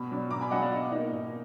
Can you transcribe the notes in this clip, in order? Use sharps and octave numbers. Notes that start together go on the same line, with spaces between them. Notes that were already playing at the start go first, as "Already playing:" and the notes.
Already playing: B2 B5
F#3 D4
B2 A#5 D6
G#5 B5
F#3 D4 D#5 F#5
D5 F5
B2 D#5
A#3 D#4
B2